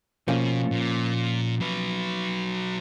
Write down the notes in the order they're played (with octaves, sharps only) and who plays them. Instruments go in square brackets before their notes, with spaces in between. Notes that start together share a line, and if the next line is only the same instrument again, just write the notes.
[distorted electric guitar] B2 [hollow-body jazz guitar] F3 A#3 C#4
[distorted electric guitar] A#2
F#3 B4